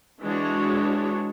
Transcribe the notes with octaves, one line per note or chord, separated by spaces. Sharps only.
E3 G#3 D4 F#4 C#5